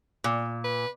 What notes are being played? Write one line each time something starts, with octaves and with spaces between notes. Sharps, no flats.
A#2
B4